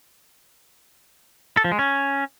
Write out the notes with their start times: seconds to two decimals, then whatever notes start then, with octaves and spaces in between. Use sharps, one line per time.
1.57 A4
1.64 F3
1.72 G#3
1.79 C#4